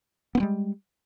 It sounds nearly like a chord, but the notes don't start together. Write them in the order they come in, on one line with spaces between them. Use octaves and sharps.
B3 C4 G3 G#3